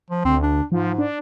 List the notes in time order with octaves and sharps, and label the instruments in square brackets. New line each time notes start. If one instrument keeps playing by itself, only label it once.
[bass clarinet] F3
[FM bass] D2 [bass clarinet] C4
[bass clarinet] D4
[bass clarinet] G#2 [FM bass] F3
[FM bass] D4